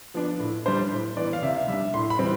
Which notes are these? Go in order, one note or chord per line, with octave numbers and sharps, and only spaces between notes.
F3 B3 D4
A2
G3 D4 C5
A2
E3 B3 D5
F5
C3 E5
G3 D4 E5
A2 C6
B5
E3 G3 C4